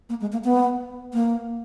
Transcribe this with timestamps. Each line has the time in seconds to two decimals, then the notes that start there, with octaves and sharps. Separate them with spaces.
0.09 A#3
0.21 G#3
0.32 A#3
0.44 B3
1.13 A#3